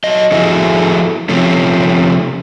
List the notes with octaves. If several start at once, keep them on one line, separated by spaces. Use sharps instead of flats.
F#3 D#5
F3 E4 F#4 G#4 A4 E5
C3 F3 A3 C#4